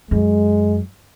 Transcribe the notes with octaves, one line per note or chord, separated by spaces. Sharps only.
F#2 G#3